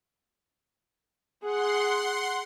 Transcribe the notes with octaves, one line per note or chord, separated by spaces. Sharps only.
G#4 F#5 C6